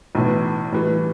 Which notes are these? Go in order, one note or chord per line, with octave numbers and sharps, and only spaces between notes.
B1 A2 E3
A2 E3 G3